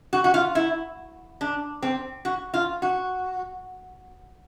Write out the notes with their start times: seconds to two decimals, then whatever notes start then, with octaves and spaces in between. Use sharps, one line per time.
0.13 F#4
0.24 F#4
0.34 F4
0.55 E4
1.41 D4
1.83 C4
2.25 F#4
2.54 F4
2.82 F#4